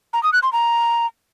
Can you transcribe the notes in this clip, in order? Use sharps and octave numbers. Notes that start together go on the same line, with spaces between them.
A#5
D#6
F#6
C6
A#5